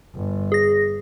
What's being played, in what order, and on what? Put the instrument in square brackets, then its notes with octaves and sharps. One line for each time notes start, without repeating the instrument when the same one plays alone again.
[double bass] G1
[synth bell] G#4 A#6